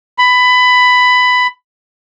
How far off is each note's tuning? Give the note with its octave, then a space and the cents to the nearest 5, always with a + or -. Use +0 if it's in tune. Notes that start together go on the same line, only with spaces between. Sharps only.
B5 +15